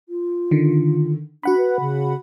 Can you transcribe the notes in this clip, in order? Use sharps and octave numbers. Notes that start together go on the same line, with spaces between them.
F4
D3 D#3
D4 F#4 F#5 B5
B4
C#3